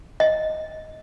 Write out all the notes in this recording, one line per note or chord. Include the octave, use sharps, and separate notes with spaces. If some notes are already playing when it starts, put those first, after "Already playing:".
D#5